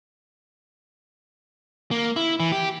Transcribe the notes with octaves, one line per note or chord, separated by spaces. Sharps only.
A#3
E4
E3
G4